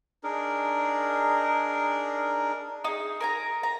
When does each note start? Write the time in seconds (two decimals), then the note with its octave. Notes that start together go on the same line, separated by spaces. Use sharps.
0.24 D4 D#4 G#4 A#4
2.84 D#4 G#4
3.21 A#4 G#5 A#5
3.63 A#5